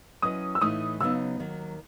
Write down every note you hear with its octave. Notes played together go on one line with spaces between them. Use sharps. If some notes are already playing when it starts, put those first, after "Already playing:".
F#3 C#4 E4 B4 D#5 D#6
E6
A2 E3 A3 D#4 D#6
C#3 F#3 B3 D#4 E6
D#2 D#3 F#3